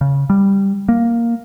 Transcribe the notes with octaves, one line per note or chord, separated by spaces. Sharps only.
C#3
G3
A#3